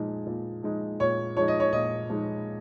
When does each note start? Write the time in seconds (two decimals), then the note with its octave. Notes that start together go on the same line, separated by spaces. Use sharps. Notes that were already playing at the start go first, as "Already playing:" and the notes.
Already playing: A#2 F3 G#3 D#4
0.27 A#2
0.63 F3 G#3 D#4
1.00 A#2 C#5
1.37 F3 G#3 D#4 C#5
1.48 D#5
1.60 C#5
1.73 A#2 D#5
2.10 F3 G#3 D#4